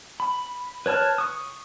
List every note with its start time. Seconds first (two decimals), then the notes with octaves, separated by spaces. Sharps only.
0.20 B5
0.86 B4 C#5 A5 F6 F#6
1.18 C#6 D#6